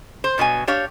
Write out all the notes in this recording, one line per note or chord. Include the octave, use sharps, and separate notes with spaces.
C5
G2 B2 F#3 G#5
D4 G4 C#5 F5